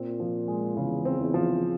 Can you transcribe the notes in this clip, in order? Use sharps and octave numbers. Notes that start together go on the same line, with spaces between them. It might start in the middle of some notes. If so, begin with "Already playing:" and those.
Already playing: A#2 C4
F3
G#3
E2 C#3
C4
E2
F3